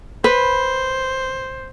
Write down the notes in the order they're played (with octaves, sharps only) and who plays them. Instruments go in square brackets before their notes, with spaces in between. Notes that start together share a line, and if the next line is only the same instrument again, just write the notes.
[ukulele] B4 [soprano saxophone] C5